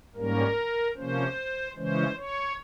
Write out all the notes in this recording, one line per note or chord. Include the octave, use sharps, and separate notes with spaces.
G#2 G3 A#3 C#4 A#4
C3 F3 A#3 C#4 C5
C#3 E3 G#3 C#4 C5
C#5